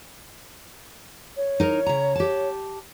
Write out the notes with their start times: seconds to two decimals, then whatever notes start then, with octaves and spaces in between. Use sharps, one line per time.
1.36 C#5
1.60 D#4 A#4
1.86 C#3 A#5
2.15 G4 A5